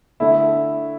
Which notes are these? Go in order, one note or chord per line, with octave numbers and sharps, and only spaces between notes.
D3 A3 E4